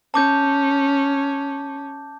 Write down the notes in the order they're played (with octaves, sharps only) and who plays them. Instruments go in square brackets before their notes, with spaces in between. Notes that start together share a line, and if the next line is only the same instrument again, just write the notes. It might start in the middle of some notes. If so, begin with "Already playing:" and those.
[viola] C#4 [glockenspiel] A5 D6 G6